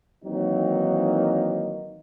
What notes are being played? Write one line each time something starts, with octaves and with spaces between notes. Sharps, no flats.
D#3 E3 F#3 A#3 C4 D#4